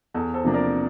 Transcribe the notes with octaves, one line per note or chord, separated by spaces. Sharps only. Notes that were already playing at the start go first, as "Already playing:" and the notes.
E2 A4
A4 C5
C3 F3 A#3 D4
A#4 D5